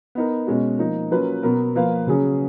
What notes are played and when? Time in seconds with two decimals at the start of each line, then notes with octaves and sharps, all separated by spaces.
0.15 B3 D#4 A#4
0.47 B2 G#3 C#4 F#4
0.79 F3 A#3 D#4
1.11 F#3 A#3 C#4 F4 B4
1.43 B2 F#3 B3 F#4 A#4
1.76 F3 A#3 F4 B4 F5
2.07 C#3 F#3 C#4 G#4